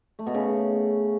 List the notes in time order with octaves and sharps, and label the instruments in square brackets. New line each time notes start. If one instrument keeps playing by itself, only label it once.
[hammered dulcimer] A3
B2
C#3